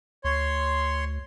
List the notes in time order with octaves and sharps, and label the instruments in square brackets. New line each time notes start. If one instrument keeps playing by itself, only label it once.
[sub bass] D2 [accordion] C#5 C6